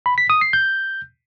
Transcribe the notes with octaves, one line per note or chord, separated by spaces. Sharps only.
B5
B6
D#6
C7
G6